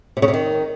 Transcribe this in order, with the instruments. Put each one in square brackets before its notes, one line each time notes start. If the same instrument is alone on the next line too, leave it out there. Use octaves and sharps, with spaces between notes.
[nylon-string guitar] C3
C#3
C3
D#3